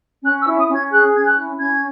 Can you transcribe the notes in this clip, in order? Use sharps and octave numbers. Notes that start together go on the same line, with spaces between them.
C#4 F#6
E6
E4
D#6
C#4
G#6
G#4 F#6
C#4 G#6
F#6
E4
C#4 G#6